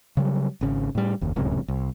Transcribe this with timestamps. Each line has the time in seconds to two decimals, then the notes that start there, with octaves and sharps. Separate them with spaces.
0.17 C#3 F#3 G3
0.61 G#1 C#3
0.95 A2 G3
1.21 F#1 D#2
1.36 D1 C#2 F#2 C3
1.68 C2